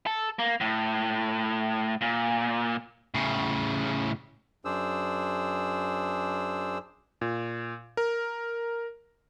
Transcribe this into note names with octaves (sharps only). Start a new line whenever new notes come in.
A4
A#3
A2
A#2
A2 C#3
F#2 D4 G#4 C5 E6
A#2
A#4